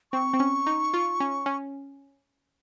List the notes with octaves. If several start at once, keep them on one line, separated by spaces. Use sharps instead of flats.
C4 C#6
C4
C#4
D#4
F4
C#4
C#4